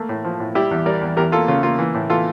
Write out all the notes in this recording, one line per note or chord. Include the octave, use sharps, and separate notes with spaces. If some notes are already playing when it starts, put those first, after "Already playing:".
Already playing: A3 A#3
A2
F3
A2
G3 E4 G4
E2
G3 A#4 D5
E2
E2 G4 A#4
A#3 F4 A4
C#3 F4
A#3 F4
E3
A2
E3 F4 A4